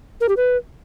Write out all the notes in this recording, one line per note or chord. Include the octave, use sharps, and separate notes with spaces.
A#4
G4
B4